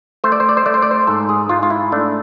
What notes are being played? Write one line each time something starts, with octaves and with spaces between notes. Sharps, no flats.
A3 C5
D5
C5
D5
C5
A3 D5
C5
D5
C5
G#2 A4
G#4
G#2 F4
F4
E4
A3 D4